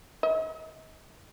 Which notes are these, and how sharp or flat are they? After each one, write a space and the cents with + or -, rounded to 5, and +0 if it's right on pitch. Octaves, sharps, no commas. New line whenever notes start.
D#5 +40